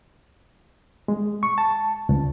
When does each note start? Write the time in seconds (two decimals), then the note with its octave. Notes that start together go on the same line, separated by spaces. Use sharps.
1.08 G#3
1.43 C#6
1.58 A5
2.09 C#2